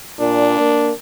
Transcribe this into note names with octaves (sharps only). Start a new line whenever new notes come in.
A#2 D4
A#3